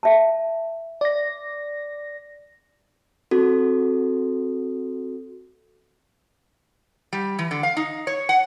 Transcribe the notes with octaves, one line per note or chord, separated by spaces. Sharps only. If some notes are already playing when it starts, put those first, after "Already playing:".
E5 A5
D5 A#6
C4 F#4 A4
G3
E3
D3
F5
D#4
C#5
F#5